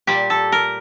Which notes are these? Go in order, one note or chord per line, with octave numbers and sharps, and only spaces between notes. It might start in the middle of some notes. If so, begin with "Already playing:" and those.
A#2 G3 G4
A4
A#4